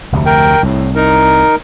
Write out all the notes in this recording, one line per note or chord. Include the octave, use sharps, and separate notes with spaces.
F1 D2 C3
A#4 G5
C2 A2
D#4 A#4